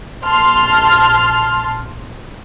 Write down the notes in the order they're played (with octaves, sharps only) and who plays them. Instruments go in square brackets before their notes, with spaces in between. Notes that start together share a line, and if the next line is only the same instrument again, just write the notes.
[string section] A#1 A5 C6 F6